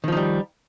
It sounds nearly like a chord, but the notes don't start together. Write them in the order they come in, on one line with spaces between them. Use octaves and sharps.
D#3 F3 D#4 G3